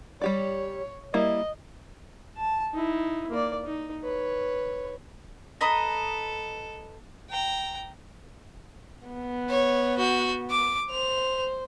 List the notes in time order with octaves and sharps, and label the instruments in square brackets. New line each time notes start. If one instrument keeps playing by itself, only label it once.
[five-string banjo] G3 G4 D5 [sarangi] C#5
[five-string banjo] G3 A#3 E4 [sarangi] D#5
[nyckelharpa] A5
D#4 E4
A#3 D5
D#4
B4 C#5
[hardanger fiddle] A4 [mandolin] B4 D#5 A#5
[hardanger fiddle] G5 A#5
[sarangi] B3
[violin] C#5
F#4 G6
D6
[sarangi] C5 [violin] F7